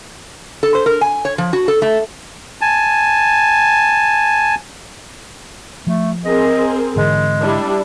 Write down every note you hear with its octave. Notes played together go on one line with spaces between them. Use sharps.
A4
C5
A#4
G#5
C#5
F3
F#4
A4
A3
G#5 A5
F3 A3
C4 G#4 A#4 D#5
G#2 D3 E3 G#3
G3 D4 E4